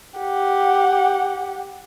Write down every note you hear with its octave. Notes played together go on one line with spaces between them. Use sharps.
G4 F#5